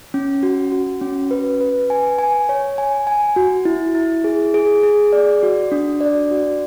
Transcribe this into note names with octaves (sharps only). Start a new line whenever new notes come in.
C#4
F#4
F#4
C#4
B4
B4
G#5
G#5
C#5
G#5
G#5
F#4
E4
E4
G#4
G#4
G#4
D5
F#4
D4
D5
F#4